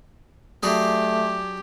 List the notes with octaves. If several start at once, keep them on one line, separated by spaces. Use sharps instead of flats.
F#3 A3 D4 G4 G#4